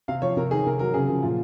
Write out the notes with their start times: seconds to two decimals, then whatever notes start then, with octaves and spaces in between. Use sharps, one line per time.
0.08 C3 F5
0.22 F3 C#5
0.36 C3 A#4
0.51 D#3 G#4
0.66 C3 A#4
0.79 F#3 A#4
0.94 C#3 G#4
1.09 F3
1.23 A#2 F4